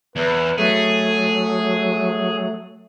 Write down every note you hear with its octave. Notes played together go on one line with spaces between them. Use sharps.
E2 B4
F#3 A3 G#4